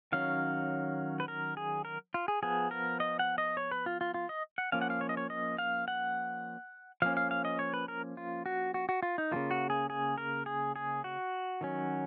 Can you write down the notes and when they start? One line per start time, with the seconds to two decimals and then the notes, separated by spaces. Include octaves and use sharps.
0.12 D#3 F#3 C#4 F5
1.20 B4
1.28 A#4
1.57 G#4
1.85 A#4
2.14 F4
2.28 G#4
2.43 F3 B3 G#4
2.71 A#4
3.00 D#5
3.19 F#5
3.38 D#5
3.57 C#5
3.71 B4
3.86 F4
4.01 F4
4.14 F4
4.29 D#5
4.58 F#5
4.72 F3 A#3 C#4 F5
4.81 F#5
4.90 F5
5.01 C#5
5.09 D#5
5.17 C#5
5.30 D#5
5.58 F5
5.88 F#5
7.02 F3 A#3 C#4 F5
7.17 F5
7.31 F5
7.45 D#5
7.59 C#5
7.74 B4
7.88 A#4
8.17 F4
8.46 F#4
8.74 F#4
8.89 F#4
9.03 F4
9.18 D#4
9.31 C#3 F3 A#3 F4
9.51 F#4
9.70 G#4
9.90 G#4
10.18 A#4
10.46 G#4
10.76 G#4
11.04 F#4
11.61 D#3 F#3 C#4